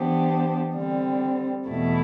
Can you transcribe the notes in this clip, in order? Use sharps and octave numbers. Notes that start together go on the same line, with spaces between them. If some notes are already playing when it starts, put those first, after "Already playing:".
Already playing: E3 B3 D4 G4 C5
D3 G3 C4
E2 B2 A3 E4